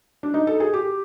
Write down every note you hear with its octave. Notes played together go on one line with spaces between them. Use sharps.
D4
D#4
A4
G#4
G4